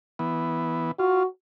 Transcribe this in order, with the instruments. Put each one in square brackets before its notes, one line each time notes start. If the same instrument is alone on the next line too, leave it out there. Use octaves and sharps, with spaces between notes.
[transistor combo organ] E3 B3
[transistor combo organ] F4 [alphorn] F#4